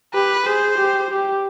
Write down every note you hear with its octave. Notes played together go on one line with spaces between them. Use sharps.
G4 B4
G#4 C5
G4
G4